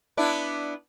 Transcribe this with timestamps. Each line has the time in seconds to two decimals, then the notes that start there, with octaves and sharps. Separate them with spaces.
0.17 B3 D4 E4